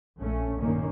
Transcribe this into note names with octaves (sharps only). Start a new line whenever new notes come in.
A#1 A3 C#4
G2 A#2 D#3 A#3 C#4